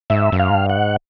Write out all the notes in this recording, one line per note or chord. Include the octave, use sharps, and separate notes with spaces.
G#2 E5
F#2
F5
G#2
G2
F#5
G#2